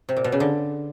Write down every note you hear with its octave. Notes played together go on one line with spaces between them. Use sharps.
C3
A#2
B2
C#3
D3